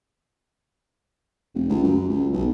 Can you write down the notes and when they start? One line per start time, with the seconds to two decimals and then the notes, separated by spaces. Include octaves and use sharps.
1.54 F1
1.69 C#2
1.84 F#2
2.09 C#2
2.33 B1